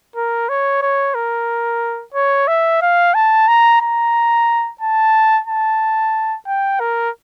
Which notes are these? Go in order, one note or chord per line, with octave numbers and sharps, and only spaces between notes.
A#4
C#5
C#5
A#4
C#5
E5
F5
A5
A#5
A#5
A5
A5
G5
A#4